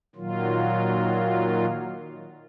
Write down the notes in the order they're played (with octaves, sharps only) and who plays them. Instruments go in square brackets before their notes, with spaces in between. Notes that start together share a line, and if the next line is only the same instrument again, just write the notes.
[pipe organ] A#2 D#3 F#3 F4